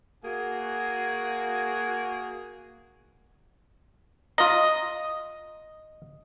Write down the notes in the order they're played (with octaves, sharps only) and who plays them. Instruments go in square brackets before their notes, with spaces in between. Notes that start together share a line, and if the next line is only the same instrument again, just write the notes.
[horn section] A#3 F#4 G#4
[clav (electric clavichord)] F4 A#5 [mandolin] D#5